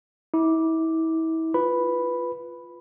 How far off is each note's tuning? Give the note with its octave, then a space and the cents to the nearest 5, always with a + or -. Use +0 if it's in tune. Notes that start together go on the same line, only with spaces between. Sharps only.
E4 -35 D6 +0
F4 +0 B4 +0 B5 +0